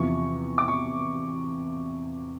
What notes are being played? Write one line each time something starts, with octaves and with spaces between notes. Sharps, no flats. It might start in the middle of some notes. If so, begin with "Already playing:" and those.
Already playing: E2 C3 F3 C#6
D6
C#6